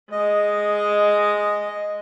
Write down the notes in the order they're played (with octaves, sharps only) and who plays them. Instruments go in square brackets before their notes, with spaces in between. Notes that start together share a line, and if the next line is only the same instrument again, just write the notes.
[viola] G#3 [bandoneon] D#5